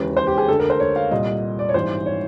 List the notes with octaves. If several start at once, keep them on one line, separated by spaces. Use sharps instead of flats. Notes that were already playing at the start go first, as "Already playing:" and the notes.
Already playing: E1 D#2 C#3 E3 B4
C5
G4
G#4
D2 D3 A4
A#4
C5
C#5
F5
C2 A#2 D#5
D5
C#5
G#1 G2 E3 C5
C#5